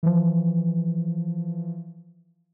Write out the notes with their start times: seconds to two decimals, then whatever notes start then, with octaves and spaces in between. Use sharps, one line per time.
0.03 E3 F3